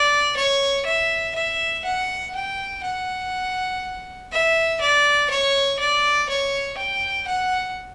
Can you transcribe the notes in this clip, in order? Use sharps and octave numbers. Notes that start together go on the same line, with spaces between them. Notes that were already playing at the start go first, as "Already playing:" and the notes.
Already playing: D5
C#5
E5
E5
F#5
G5
F#5
E5
D5
C#5
D5
C#5
G5
F#5